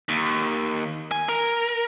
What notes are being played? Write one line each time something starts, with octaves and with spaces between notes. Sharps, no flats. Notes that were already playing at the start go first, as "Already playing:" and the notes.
D#2
G#5
A#4